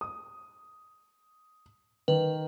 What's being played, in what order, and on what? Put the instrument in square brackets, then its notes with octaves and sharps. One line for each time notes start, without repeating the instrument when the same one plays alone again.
[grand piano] D#6
[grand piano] D#3 [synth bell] B4